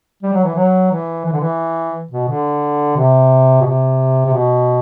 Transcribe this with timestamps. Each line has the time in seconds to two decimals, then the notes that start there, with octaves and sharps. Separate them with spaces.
0.23 G3
0.33 F#3
0.44 E3
0.56 F#3
0.91 E3
1.26 E3
1.32 D3
1.40 E3
2.11 B2
2.28 D3
2.96 C3
3.62 B2
3.66 C3
4.26 C3
4.34 B2